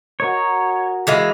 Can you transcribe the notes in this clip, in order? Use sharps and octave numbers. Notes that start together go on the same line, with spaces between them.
F#4 A#4 C#5 D#5
E3 G#3 F4